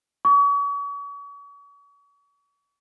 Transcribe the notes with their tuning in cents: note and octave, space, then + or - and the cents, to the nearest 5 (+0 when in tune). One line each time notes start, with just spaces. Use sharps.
C#6 +40